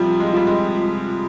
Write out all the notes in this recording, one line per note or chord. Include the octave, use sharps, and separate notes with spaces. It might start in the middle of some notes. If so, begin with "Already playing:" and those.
Already playing: C3 F3 G3 F4
G#3
G3 F4
G#3